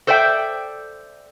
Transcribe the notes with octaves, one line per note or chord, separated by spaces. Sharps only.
A4 C5 D5 E5 G5